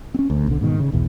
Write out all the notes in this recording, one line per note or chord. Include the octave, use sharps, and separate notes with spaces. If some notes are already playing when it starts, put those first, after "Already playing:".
C4 C#4
D2
B1 D3
G#2 B2 D#3
C#3
B1 E2 B2